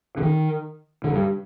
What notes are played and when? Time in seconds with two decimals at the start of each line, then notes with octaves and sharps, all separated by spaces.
0.18 D3
0.22 D#3
1.04 D3
1.14 G2